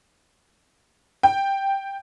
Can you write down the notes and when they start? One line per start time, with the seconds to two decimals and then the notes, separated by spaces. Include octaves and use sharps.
1.23 G5